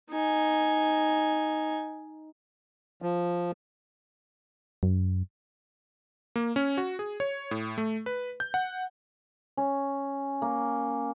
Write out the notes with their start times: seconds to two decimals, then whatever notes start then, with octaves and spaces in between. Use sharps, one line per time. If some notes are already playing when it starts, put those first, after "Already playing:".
0.11 D#4 G#5
3.02 F3
4.83 F#2
6.36 A#3
6.56 C#4
6.78 F#4
6.99 G#4
7.20 C#5
7.51 A2
7.78 A3
8.06 B4
8.40 G6
8.54 F#5
9.57 C#4
10.42 A#3